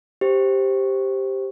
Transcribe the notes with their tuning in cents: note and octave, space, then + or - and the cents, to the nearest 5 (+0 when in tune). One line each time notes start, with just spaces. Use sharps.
G4 +0 C5 +5